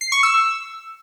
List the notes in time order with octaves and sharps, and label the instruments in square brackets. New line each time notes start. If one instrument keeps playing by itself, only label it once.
[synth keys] C7
C#6
E6